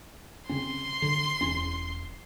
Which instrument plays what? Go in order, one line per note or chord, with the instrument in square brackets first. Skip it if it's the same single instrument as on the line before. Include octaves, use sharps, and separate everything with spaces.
[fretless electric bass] C#3 C4 C#4 [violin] C6
[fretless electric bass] D3
E1 E2 C#4